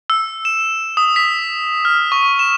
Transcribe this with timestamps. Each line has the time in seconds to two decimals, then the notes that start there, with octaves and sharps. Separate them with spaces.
0.10 E6
0.45 E7
0.97 D#6
1.16 B6
1.85 F6
2.12 C#6
2.39 E7